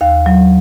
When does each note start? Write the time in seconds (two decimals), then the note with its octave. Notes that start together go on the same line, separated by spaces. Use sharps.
0.01 D#2 F5
0.26 F#3